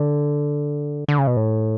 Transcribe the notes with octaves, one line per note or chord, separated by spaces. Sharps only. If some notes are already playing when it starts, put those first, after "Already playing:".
Already playing: D3
D3
C#3
B2
A2